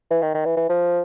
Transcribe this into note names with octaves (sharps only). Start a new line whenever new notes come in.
E3
D#3
D#3
E3
E3
F3